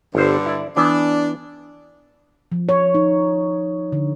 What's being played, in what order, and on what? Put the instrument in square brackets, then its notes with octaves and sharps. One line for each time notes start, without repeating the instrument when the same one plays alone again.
[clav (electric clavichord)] G1 C5 [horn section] G2 D3
[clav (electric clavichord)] E4 D5
[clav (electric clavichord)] E3 B3 [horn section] D4
[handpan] F3
C#5
D#4
D3